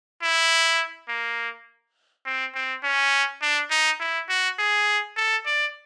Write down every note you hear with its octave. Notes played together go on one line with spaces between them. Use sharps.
E4
A#3
C4
C4
C#4
D4
D#4
E4
F#4
G#4
A4
D5